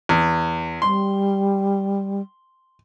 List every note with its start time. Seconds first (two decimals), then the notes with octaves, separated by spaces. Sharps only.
0.09 E2
0.82 G3 C6